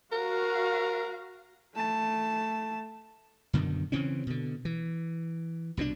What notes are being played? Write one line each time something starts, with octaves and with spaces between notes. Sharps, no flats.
F#4 A#4 F5
A3 A5
F#2 B2 D3 D#3
C#3 E3 C4 C#4
B2 D3
E3
C2 B2 F3 D4